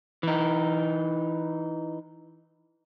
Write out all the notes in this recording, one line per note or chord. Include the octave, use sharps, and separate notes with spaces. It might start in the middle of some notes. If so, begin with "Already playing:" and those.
E3 D#4